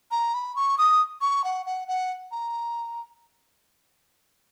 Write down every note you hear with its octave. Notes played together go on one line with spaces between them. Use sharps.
A#5
B5
C#6
D#6
C#6
F#5
F#5
F#5
A#5